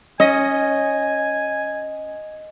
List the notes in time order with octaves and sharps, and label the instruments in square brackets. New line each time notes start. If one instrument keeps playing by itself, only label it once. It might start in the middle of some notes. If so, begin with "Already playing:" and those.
[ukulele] C#4 [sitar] D#5 [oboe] G#5